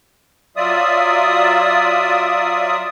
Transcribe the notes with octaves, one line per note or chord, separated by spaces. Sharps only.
F#3 F4 D5 E5 D#6